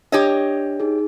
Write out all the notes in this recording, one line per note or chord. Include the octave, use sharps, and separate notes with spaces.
D4 G4 C#5 D#5
D#4 G#4